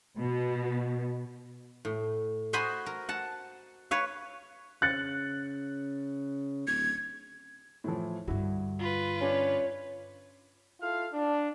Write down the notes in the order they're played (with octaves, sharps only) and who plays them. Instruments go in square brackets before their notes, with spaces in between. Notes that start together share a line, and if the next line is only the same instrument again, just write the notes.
[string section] B2
[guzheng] A2
F#4 C5 D#5 G#5 B5 C6
A#4
F#5 A5
B4 C#5 F5
[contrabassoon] C#3 [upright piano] F#6 A6 C#7
[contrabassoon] D1 [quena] G#6
[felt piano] A2 E3 F3
[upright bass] G2 D3 [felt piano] E4 F#4
[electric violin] F4 B4
[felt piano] C#4 D4 [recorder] C#5
[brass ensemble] E4 F4 A4 F5
D4